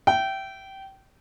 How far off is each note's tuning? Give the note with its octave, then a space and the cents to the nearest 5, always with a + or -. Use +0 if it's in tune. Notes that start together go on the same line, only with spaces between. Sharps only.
E5 +20 G5 -20